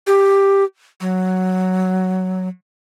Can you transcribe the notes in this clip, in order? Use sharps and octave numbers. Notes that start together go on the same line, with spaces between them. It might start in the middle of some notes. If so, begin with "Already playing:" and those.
G4
F#3